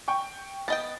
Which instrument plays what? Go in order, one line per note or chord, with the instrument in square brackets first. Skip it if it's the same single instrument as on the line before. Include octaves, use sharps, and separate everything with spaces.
[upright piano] G5 C#6
[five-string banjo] B3 D#5 G5 [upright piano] A6